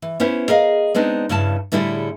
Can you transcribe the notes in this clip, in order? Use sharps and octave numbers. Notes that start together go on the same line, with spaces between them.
E3
B3 C#4 E4 C5
G#4 A#4 D#5 F5
G#3 B3 C4 D4 D#4
G2 C#3 E4 A5
A2 D3 G3 E4 F#4 G#4